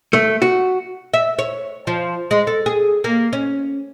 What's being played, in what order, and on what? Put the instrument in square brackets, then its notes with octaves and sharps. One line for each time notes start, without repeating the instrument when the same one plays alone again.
[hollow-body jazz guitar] A3
F#4
[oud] E5
C#5
F3
G#3
A4
G#4
A#3
C#4